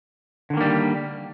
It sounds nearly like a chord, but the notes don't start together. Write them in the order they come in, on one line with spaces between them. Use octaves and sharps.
D3 D#3 A#3 G3